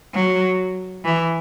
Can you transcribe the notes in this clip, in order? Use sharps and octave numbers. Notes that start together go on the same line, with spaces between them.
F#3
E3